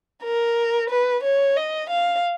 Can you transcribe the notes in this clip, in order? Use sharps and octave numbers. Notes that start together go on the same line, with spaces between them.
A#4
B4
C#5
D#5
F5